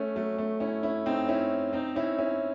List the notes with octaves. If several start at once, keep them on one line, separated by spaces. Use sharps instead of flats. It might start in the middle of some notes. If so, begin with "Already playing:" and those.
Already playing: A3 C#4
F#3 A3
A3 C#4
C#4 E4
C#4 E4
C4 D#4
C#4 E4
C4 D#4
C#4 E4
C#4 E4